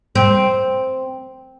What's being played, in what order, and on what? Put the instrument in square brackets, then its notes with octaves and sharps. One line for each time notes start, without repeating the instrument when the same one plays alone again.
[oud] C4